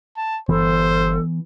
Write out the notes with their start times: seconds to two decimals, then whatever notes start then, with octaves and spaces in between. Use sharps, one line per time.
0.17 A5
0.49 G1 E3 B3 A4 C5